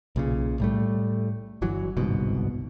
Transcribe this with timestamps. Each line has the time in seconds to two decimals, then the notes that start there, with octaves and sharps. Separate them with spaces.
0.16 B1 A#2 C#3
0.60 A2 G3 A3
1.62 G1 E3 F#3
1.97 G1 C2 G#2 B2